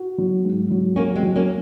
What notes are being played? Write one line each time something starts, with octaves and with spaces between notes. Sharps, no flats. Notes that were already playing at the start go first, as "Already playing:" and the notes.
Already playing: F#4
F#3
G#2
F#3
A#3 C#4 F#4
G#3 C4
F#3
A#3 C#4